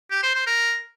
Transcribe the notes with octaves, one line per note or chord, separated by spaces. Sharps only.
G4
C5
C5
A#4